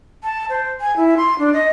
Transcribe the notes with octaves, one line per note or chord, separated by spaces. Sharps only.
A5
C5
G#5
E4
C6
D4
D#5